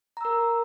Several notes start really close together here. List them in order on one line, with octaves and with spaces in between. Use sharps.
A#5 E6 A#4